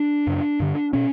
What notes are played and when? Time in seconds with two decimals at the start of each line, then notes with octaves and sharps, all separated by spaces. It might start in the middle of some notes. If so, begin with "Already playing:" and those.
Already playing: D4
0.27 F#2 C#3
0.60 G2 D3
0.93 B2 C#4